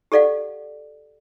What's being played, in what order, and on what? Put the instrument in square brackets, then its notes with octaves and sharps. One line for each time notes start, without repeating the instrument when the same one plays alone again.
[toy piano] G4 A4 D5 F5 F#5